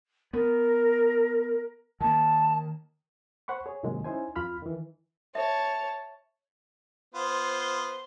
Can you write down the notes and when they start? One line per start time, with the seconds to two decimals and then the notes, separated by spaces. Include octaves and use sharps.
0.33 B3 A#4
2.01 D#3 A#3 A5
3.48 C5 F#5 B5 C#6
3.66 G#4 C#5
3.83 G#2 C3 D#3 F#3 G#3 A#3
4.04 C#4 D#4 E4 C5 G#5
4.36 F2 F4 B5 F6
4.62 D#3 E3
5.35 C#5 E5 A5
7.14 B3 F4 C5 C6